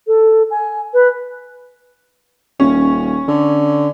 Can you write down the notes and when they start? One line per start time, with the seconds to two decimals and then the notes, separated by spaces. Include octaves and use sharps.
0.07 A4
0.50 G#5
0.93 B4
2.60 D#1 C#4
3.28 D3